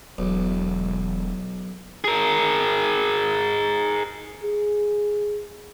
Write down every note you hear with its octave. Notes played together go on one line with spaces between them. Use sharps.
E1 B1
G#4 A#4
G#4